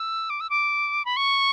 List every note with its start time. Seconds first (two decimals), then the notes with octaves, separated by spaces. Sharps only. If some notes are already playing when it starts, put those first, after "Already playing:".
Already playing: E6
0.30 D6
0.40 E6
0.50 D6
1.05 B5
1.16 C#6